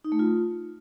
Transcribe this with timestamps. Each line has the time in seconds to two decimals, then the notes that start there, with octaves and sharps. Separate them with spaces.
0.04 D#4
0.12 A3
0.19 F4